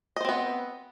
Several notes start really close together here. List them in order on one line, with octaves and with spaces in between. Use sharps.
D#5 C5 C4 B3